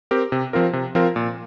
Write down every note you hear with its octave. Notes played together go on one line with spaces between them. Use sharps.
C4 G4 A#4
C3
F3 C4 F4 A#4
C3
F3 C4 F4 A#4
A#2